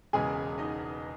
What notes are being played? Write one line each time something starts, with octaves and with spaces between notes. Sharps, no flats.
E1 E2 C#3 G#3 G#4 G#5
D#4 D#5